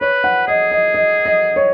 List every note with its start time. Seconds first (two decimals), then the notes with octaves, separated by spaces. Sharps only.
0.01 B4 C#5
0.24 F#5
0.48 G#4 D#5
0.71 D#5
0.94 D#5
1.26 D#5
1.56 C#5